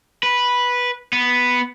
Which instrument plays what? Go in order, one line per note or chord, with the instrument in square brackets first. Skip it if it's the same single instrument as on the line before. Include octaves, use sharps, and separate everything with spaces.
[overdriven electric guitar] B4
B3